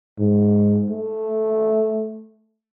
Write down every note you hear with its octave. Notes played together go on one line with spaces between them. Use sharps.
G#2
A3